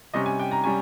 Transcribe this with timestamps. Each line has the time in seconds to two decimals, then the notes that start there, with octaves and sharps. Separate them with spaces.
0.14 C3 G3 C#4 D#5
0.26 G#5
0.40 G5
0.51 A#5
0.64 G3 C#4 G#5